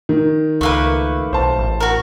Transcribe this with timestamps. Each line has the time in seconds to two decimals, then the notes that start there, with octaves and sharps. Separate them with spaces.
0.09 D#3
0.61 C#2 A3 A#3 B4
1.33 B1 C5 A5
1.58 A1
1.80 F#4 A#4